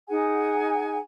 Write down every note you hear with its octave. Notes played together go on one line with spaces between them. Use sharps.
D#4 G#4 F#5 G#5